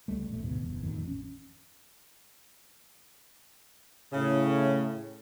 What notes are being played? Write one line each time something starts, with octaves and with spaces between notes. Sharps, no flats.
C#2 G3 A3
F1 A#1 A3
D2 G#2 B2
F#1 E2
A1 F2 D#3
C#4
A2 C#3